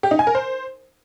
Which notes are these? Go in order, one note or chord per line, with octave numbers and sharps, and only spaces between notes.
G4
D#4
G#5
A#4
C5